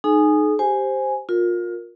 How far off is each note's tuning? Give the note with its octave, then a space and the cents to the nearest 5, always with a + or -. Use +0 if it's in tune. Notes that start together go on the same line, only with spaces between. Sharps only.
D#4 -20 G#4 +40 G#5 +0
G4 +0 C5 +0 G#5 +0
F4 +25 A#4 +0